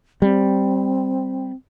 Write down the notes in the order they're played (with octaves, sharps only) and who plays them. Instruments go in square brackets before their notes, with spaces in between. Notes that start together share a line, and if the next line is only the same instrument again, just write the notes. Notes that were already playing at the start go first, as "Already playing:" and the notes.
[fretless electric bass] G3 [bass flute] C4